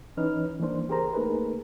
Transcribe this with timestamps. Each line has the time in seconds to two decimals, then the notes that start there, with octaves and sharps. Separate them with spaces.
0.17 E3 C#4 D#4 B4 F6
0.60 E3 G3 A#3 D4 C5
0.89 C#2 G4 G#4 A#4 C5 A#5
1.14 A3 A#3 D#4 G#4 A#4 B4